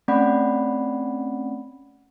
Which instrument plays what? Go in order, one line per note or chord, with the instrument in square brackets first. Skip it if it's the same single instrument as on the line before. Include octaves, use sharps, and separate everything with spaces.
[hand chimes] A3 C4 C#4 D5 F#5 B5